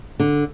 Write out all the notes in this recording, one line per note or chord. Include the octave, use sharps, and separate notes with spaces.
D3